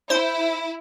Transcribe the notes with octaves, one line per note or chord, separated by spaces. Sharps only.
E4 C5